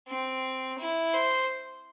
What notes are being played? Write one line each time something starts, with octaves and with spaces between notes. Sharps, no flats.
C4
E4
C5